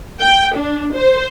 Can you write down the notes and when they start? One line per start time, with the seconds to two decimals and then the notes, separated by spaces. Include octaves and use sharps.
0.21 G5
0.56 D4
0.95 C5